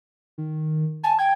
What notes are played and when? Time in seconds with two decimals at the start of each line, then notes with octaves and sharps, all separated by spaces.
0.38 D#3
1.04 G#5 A5
1.19 G5 G#6